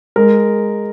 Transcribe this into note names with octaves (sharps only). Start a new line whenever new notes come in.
G#3 A#4